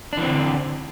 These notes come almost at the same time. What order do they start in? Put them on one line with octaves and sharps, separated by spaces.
D4 E3 C4 D3